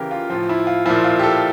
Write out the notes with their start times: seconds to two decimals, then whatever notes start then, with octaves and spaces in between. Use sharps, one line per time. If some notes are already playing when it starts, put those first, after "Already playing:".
Already playing: C#3 E3 G4 A#4
0.11 F4
0.30 A2 F3 F4
0.49 E4
0.67 F4
0.86 A#2 F3 E4
1.04 F4
1.19 G4
1.24 A4